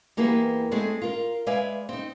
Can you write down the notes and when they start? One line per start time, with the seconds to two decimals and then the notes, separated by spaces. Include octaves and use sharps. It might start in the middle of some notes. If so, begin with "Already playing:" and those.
0.17 E2 A#3 E4 G4 G#4 B4
0.71 G#3 A3 C4 G#4
1.02 F4 A#4
1.47 G#3 B4 D5 E5 F5 G#5
1.89 C4 D#4